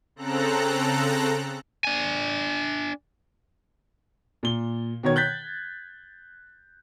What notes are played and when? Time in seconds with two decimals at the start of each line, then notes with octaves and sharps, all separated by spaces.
0.16 C#3 C4 A4 A#5 F#6
1.84 D4 G#5
4.43 A#2 G7
5.03 B2 D#3 C#5 G#6
5.16 F#6 G6 A6 B6